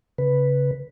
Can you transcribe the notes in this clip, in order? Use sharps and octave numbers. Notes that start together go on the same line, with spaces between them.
C#3 B4